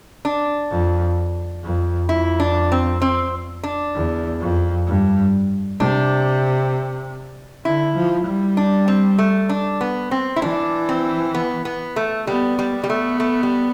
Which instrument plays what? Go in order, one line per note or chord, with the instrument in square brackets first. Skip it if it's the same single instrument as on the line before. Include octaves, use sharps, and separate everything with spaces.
[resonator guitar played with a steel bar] D4
[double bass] F2
F2
[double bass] F2 [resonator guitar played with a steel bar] E4
[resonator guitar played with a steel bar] D4
C4
C4
D4
[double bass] E2
F2
G2
[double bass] C3 [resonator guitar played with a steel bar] D4
[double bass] D3 [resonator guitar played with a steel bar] E4
[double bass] F3
G3
[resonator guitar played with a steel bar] D4
C4
A3
D4
B3
C4
E4
[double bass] E3 [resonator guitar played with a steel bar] D4
[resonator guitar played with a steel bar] C4
B3
B3
A3
[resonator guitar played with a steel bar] G3 [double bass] B3
[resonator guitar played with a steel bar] G3
[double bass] B3
[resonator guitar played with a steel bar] G3
A3
A3
G3